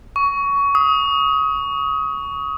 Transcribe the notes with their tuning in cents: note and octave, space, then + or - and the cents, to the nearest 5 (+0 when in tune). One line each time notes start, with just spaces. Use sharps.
C#6 +20
D#6 +25